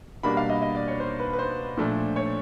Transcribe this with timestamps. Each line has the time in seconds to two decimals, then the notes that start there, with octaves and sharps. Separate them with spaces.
0.23 B2 G3 A#3 D4 B5
0.37 F5
0.49 D#5
0.62 D#5
0.75 D5
0.88 C#5
1.00 C5
1.19 B4
1.33 B4
1.39 C5
1.77 A#2 F3 A3 D4
2.16 C#5